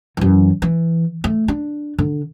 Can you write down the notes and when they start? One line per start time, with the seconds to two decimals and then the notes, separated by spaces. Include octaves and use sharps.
0.17 F#2 E3
0.62 E3
1.24 A3
1.48 D4
1.99 D3